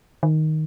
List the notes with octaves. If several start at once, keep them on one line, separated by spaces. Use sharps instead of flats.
D#3